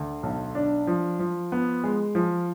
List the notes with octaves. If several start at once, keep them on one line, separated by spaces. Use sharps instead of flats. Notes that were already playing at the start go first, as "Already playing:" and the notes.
Already playing: D2
B1
D4
F3
F3
B3
G#3
F3